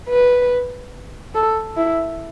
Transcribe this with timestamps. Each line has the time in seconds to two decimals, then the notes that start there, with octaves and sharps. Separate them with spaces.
0.09 B4
1.34 A4
1.77 E4